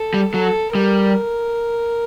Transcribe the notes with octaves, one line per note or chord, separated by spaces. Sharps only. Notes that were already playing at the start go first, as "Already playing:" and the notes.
Already playing: A4
G3
F#3 A4
G3 A#4